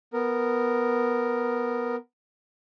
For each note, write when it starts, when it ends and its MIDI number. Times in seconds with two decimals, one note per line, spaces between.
0.13 1.96 59
0.13 1.96 70